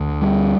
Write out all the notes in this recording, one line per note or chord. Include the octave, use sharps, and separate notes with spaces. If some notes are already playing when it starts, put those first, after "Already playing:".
Already playing: D2
G3